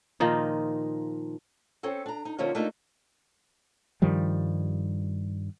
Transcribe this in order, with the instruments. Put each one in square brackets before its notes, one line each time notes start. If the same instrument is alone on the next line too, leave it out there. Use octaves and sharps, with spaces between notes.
[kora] A#2 D#3 F3 D#4
[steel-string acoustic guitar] C4 C#4 A4
D4 A#5
D#4
D3 F3 A#3 C4 C#4 D#4
A3 A#3 D4 D#4 F4
[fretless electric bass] G2 D#3 F3 G3